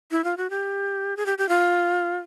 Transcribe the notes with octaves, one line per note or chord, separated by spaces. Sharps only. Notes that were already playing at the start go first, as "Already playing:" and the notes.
E4
F4
F#4
G4
G#4
G4
G4
F4